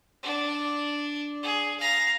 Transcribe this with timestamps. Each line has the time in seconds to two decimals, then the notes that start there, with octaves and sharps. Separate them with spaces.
0.23 D4
1.43 G#4
1.79 F5 A#5